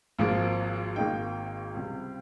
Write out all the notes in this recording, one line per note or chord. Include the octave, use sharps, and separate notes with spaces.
G#1 G#2 F3 A#3
G#1 G#2 D#3 A#3 D#4 G5
C#2 C3 G3